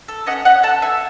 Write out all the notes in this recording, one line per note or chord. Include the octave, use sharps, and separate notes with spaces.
A4
C#4 D#5 F#5
C#4 D#5 F#5
A4 F#5 A5
A4 E5 G#5